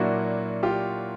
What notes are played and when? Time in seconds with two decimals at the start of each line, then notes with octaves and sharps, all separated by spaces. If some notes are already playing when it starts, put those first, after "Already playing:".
Already playing: A#2 F#3 A#3 D4 E4 F#4
0.63 F4 G4